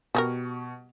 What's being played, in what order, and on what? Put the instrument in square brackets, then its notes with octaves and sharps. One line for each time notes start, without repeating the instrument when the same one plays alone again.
[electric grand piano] B2 C#6 [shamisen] G3 G#4 A#4